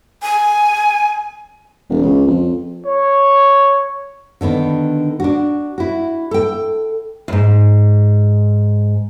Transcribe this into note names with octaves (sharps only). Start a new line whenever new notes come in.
G#5
E1
C#2
F2
C#5
D3 D#3 B3 D4
D4 F#4
E4 F#4
A4 G5
E2 G#2